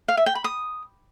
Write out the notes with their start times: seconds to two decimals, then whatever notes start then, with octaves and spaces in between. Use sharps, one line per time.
0.08 F5
0.17 E5
0.26 G5
0.35 B5
0.44 D#6